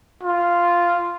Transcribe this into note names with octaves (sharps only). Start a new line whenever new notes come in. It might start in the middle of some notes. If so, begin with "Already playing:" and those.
F4